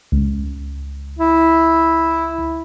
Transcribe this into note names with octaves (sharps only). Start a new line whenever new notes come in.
C#2
E4